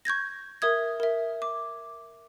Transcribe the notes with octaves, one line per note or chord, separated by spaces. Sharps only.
C#6 G6 G#6 A#6
A#4 E5 D#6 G#6
A#4 E5
D6